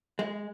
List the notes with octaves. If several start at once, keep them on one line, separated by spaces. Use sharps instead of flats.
G#3